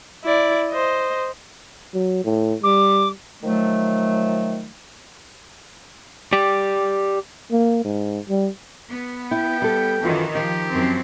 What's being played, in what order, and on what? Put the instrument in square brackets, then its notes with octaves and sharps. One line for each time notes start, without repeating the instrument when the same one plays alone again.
[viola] E4 D5
C5 D#5
[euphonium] F#3
A2
[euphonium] G3 [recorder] D6
[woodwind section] D#3 F3 F#3 A3
[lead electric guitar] G4 D5
[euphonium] A#3
G#2
G3
[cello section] B3
[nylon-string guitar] E4 [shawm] G5
[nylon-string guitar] G3 A4
[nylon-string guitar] F#2 F4 [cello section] D#3 E3
[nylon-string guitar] D#3 D#4 [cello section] F3 [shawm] G4
[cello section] F#2 F3 C4